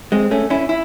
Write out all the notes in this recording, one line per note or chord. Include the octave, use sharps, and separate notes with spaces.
G#3 C4
A3 C#4
C#4 E4
E4